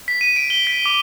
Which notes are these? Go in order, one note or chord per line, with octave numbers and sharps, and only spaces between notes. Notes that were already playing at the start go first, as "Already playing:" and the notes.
B6
D#7
D7
G7
B6
D6